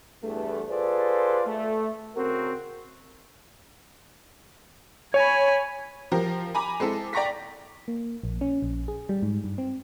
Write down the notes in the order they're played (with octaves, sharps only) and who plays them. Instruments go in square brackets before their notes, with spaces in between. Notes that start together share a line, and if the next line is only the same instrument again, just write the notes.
[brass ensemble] E2 G2 A3
F4 G#4 A4 B4 C5 D5
A3
C#3 C4 F#4 A#4
[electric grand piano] C#5 [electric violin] G#5 B5
[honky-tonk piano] F3 G4 A#4
G#5 A#5 B5 D6
G#3 C4 E4 A4
D5 G5 A#5 C#6 A#6 B6
[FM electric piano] A#3
A#1
C#4
A#1
G#4
G3
G#2
G2
C4